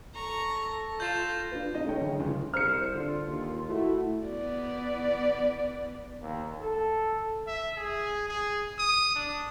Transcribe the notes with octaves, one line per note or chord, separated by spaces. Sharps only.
A4 A#5 C#6
A#6
F4 G6 A6 E7
D4 F4 B4
C3 D#4 D#5
A3 C#4 D#4 C#5 G5
D2 G#4
C#2
C2 C5 F6 C#7
D3 F4
D#2
A3 E4 F#4
B3 D5
D#2
A4
E5
G#4
G#4
D#6
D4